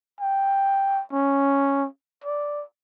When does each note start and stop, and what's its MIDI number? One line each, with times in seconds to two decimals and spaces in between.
0.21 1.02 79
1.13 1.87 61
2.24 2.63 74